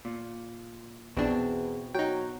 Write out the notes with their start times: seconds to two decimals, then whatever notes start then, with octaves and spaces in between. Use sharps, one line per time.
0.05 A#2
1.17 A#1 E2 B2 C4 D4
1.94 F#3 D#4 G5